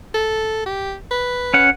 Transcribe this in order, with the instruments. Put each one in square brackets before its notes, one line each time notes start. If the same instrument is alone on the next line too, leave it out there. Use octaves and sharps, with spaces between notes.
[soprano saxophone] A4
G4
B4
[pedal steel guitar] C#4 F#5